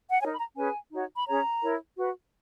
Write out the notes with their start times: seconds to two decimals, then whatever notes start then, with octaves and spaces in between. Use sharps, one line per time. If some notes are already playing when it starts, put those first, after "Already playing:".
0.10 F#5
0.20 D#4 A#4 C#5 G#5
0.32 B5
0.37 A#5
0.55 C#4 G#4 B4 G#5
0.90 D#4 F#4 C#5
1.16 B5
1.26 C#4 G#4 C#5 A#5
1.62 E4 A#4 C#5
1.97 F#4 B4